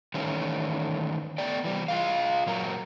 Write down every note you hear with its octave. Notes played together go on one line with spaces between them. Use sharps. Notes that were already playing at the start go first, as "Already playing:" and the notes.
D#3 E3 G3 A3 C#4
A3 B3 D5 G5
E3 G3
F4 G#4 F5
A#2 F#3 A#4